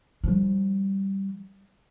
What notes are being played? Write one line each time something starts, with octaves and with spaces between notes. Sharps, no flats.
F3 G3